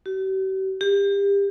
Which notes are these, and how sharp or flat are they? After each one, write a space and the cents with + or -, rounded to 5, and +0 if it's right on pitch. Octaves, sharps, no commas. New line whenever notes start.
G4 -45
G4 +30